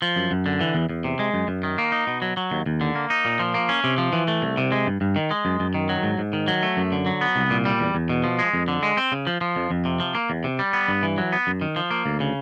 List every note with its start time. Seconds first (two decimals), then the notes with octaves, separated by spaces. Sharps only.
0.02 F3
0.16 F#2
0.31 F#2
0.46 D3
0.61 E3
0.75 E2
0.89 E2
1.04 C3
1.19 G#3
1.34 F#2
1.48 F#2
1.63 D#3
1.78 A#3
1.92 D#4
2.07 B2
2.22 F#3
2.37 F#3
2.51 D#2
2.66 D#2
2.81 D3
2.95 A#3
3.10 D#4
3.25 A#2
3.39 F3
3.54 A#3
3.69 C#4
3.84 C3
3.98 F3
4.13 E3
4.28 A3
4.42 C2
4.57 C3
4.72 G#3
4.86 G2
5.01 G2
5.16 D#3
5.31 G#3
5.45 F#2
5.60 F#2
5.74 D#3
5.89 F#3
6.03 G#2
6.18 G#2
6.33 D#3
6.48 F#3
6.63 A3
6.77 F#2
6.92 D3
7.06 F#3
7.21 B3
7.36 C2
7.50 A#2
7.65 G3
7.80 E2
7.95 E2
8.09 B2
8.24 F3
8.39 G#3
8.54 F2
8.68 D3
8.83 G#3
8.97 C4
9.12 C#3
9.27 F3
9.41 F3
9.56 F2
9.71 F2
9.85 C3
10.00 F3
10.15 A#3
10.30 E2
10.44 C3
10.59 G3
10.73 B3
10.88 G2
11.03 E3
11.18 F#3
11.33 B3
11.47 F#2
11.61 D#3
11.76 F3
11.91 A#3
12.06 D2
12.20 C#3